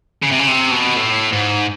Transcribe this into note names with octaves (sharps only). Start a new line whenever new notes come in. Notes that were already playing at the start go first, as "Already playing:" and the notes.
C#3
C3
C#3
C3
B2
A2
G#2